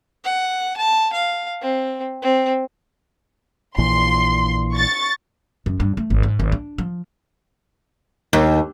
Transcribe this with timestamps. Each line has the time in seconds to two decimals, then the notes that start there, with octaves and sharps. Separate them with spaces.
0.25 F#5
0.77 A5
1.13 F5
1.61 C4
2.22 C4
3.78 A#1 A#2 E3 C6
4.74 C#6 A6
5.66 F#2
5.80 G2
5.97 A3
6.10 G#1
6.23 G#2
6.40 G#1
6.52 D4
6.78 F3
8.33 D#2